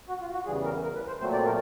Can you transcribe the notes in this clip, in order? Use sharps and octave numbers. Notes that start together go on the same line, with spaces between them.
F#4
F4
F#4
E2 C#3 E3 G3 G#4
A#4
A#4
B4
C5
A#2 F#3 A3 C4 C5
D5
A#4